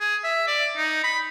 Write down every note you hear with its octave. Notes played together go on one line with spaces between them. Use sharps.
G#4
E5
D5
D#4
B5